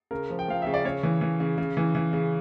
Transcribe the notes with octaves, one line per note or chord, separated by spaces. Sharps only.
C#3 A#4
F3
G5
F3 F5
C#3 E5
D5
C#3 C#5
E3
E3
C#3
C#3
E3
E3
C#3